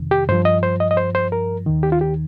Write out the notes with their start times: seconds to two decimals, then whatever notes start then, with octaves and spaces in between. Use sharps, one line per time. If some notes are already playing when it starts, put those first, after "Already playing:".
Already playing: F2 C3 D#3
0.11 G4
0.29 G2 F3 C5
0.45 D#5
0.63 C5
0.80 D#5
0.91 D#5
0.97 C5
1.15 C5
1.32 A#4
1.66 D#2 D#3
1.83 G4
1.92 F4
2.01 G4